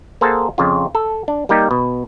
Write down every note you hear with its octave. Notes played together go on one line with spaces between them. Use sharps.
A#3 G#4 A4 C5 F#5 A5
F2 C#3 F4
A4
D4
G3 A#3 D#4 G4
B2